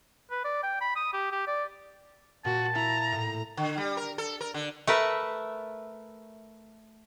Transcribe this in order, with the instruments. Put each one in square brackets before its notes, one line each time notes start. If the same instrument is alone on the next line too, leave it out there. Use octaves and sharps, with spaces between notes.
[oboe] B4
D5
G5
B5
D#6
G4
G4
D5
[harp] A#2 [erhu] F#4 [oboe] A5
[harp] E4 [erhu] A#5
[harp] A2
[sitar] D3
G3
A#4
A4
A#4
D3
[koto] A3 A#4 B4 E5